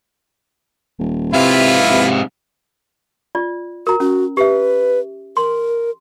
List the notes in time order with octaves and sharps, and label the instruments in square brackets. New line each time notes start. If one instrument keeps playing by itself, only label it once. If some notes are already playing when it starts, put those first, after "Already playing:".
[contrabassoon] D#1
[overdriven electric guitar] G#2 F5 [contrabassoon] C3 [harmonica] E4 F4 B4
[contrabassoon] C3
[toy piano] F4 D5
[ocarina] F#4 [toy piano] A#4 A#5
[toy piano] C#4 [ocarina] F#4
[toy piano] G4 E5 [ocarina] B4
[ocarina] A#4 [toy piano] C6